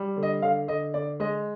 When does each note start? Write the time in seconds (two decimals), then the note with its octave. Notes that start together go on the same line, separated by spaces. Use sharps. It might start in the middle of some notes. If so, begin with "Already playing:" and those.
Already playing: G3
0.17 D3
0.23 D#5
0.42 D3 F5
0.68 D3 D#5
0.94 D3 D5
1.20 G#3 D#5